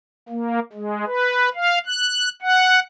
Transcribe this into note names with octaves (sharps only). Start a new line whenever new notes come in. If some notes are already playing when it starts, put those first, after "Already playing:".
A#3
G#3
B4
F5
F#6
F#5